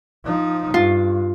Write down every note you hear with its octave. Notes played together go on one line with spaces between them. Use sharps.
F3 D#4
G2 F4